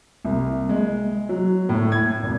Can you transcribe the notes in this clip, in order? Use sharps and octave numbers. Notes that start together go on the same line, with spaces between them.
C2
G#3
F#3
A2
G#6
G#1